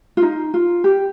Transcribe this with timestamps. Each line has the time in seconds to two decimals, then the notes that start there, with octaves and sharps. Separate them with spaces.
0.17 F4
0.22 D#4
0.54 F4
0.84 G4